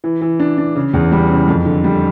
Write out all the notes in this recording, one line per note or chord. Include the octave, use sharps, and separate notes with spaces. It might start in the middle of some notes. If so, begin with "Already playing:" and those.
E3
E3
D4
D4
C#3
E2
G3
C#3
F2
D3
G3